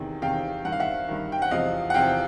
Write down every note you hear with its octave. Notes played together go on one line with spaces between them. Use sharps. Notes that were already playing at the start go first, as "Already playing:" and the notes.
Already playing: E2 C3 D#3
E2 C3 D#3 F5 G5
G2 D#3 F#5
F5
E5 F#5
G2 D#3
G5
F#5
E2 C3 F3 D#5 F5
F#5
E2 C3 F3 F5 G5